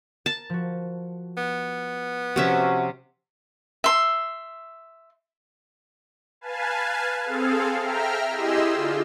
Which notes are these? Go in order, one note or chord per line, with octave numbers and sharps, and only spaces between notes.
A#4 A5
F3 F#4
B3
C3 F3 C#4 F#4 E5
E5 C6
B4 F5 G#5 A5
C4 G#4 A4 F5
E5 G5 A#5 F6
E4 G4 G#4 D#5 C6 E6
D3 F4